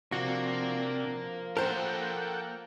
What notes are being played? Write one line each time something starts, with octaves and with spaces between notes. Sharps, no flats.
C3 F3 A#3 D4 F#4
F3
A#3 A4 A#4 C5 F#5 G5 A5